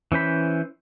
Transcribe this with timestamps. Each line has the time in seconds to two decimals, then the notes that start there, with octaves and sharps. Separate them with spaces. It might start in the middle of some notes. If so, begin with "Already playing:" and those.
0.12 E3 C#4 C5 B5